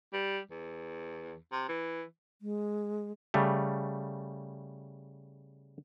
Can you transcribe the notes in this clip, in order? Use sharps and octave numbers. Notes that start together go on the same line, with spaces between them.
G3
E2
C3
E3
G#3
C#3 G3 A3